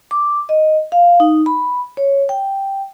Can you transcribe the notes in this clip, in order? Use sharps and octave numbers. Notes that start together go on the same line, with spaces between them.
D6
D#5
F5
D#4
B5
C#5
G5